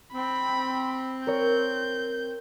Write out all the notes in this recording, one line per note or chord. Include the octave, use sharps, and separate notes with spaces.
C4 B5
A#4 C#5 G6